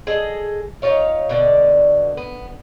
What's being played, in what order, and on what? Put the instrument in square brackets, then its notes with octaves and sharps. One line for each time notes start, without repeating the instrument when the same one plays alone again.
[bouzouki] G#4 A4 D#5
D#4 F4 C#5 F5
B2 D3 D5
B3